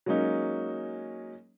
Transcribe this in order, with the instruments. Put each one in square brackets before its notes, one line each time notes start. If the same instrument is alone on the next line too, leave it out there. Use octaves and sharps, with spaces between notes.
[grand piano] F#3 G#3 A#3 C#4 D#4